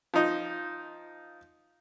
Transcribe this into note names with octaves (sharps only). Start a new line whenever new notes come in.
F3 D#4